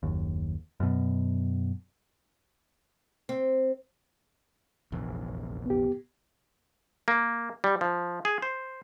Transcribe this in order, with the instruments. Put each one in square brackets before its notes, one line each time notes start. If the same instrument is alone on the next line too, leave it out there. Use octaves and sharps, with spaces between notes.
[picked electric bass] F#1 D#2
F#2 B2
[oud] C4
[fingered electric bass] F1 A#1 E2
[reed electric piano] B3 G4
[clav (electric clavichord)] A#3
G3
F3
G#4
C5